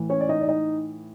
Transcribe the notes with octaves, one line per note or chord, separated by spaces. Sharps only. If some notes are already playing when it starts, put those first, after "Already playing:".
Already playing: A2 E3
C#4 C#5
D5
D#4 D#5
D5
D#4 D#5